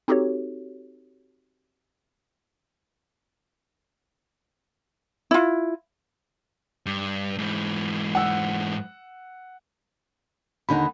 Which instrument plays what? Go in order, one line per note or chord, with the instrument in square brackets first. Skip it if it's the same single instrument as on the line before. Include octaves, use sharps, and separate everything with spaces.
[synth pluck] C4 D#4 F#4 G4 A4 C#5
[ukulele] E4 F4
[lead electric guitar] G2
G#2 E3
[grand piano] F#5 E6
[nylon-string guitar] D#2 D3 D#4 [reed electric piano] F#5 B5